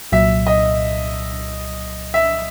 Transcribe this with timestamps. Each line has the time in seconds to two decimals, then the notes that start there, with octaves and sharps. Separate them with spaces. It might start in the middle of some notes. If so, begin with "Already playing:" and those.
0.12 C2 A#2 F#3 E5
0.47 D#5
2.14 E5